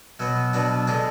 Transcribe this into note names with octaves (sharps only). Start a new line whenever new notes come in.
B2 F#3 B3
B2 F#3 B3 D4
D3 G#3 D4 G#4